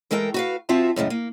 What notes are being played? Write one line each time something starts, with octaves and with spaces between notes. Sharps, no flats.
E3 G#3 A4 A#4 G5
F#4 B4 F5
F3 C4 F4 F#4 E5 A5
F#2 A2 C#3 G#3
A#3